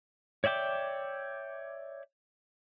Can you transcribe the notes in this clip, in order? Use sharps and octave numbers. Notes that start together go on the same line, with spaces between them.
C#5 D5 E5 G5 D6